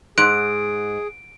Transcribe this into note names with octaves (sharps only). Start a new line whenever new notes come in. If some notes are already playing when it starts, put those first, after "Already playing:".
G#2 G#4 F#6 D7